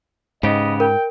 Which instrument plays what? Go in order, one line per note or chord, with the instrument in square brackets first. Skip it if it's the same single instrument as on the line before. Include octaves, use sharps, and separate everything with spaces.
[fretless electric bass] G#2 [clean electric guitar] C#3 B3 G4 [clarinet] D#5
[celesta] A#4 [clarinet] G5